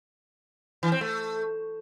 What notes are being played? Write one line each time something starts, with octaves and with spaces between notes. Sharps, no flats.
E3
C4
A3